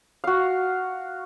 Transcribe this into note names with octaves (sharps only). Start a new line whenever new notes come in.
F#4 F5